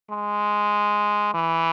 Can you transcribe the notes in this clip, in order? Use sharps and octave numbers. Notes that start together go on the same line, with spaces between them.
G#3
E3